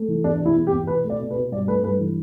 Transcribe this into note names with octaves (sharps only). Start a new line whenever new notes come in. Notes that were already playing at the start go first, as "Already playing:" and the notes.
Already playing: A3
E3
E2 D4
B2
E4
E2
G4
E2
B2 B4
A3
D5
B2
B4
B2
G2 D5
A3 B4
G2 B4
E3